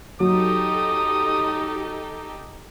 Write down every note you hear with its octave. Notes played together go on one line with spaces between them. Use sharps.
F#3 D#4 G4 A4 D#6